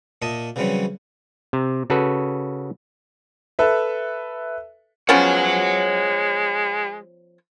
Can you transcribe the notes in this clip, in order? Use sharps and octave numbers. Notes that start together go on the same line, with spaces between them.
A#2 D#5 E5 A5 D#6
C#3 E3 F#3 G3 C4 C#4
C3
C#3 F#4 A4 B4
A4 B4 E5
F3 G#3 B3 C#4 C#5 F#5